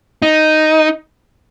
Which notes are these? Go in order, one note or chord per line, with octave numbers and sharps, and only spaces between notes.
D#4